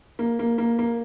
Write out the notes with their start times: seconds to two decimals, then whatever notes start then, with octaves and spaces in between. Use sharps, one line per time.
0.19 A#3
0.39 A#3
0.58 A#3
0.79 A#3